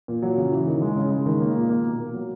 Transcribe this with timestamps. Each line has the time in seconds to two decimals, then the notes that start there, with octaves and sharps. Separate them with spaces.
0.08 A#2
0.22 F#3
0.37 C#3
0.52 E3
0.67 D#3
0.82 G#3
0.97 C#3
1.11 G#3
1.26 D#3
1.40 A#3
1.56 A#2
1.69 A#3
1.85 B2
2.00 A#3
2.14 F#3